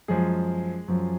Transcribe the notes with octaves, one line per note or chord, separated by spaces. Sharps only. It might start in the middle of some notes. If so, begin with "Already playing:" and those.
F#2 F3 G#3 G#4
F#2 F3